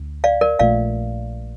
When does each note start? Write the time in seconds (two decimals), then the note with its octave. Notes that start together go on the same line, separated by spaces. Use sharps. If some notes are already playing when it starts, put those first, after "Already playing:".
Already playing: D2
0.24 D5 F5
0.41 A#4 D5
0.59 A#1 A#2 A3 D5 F5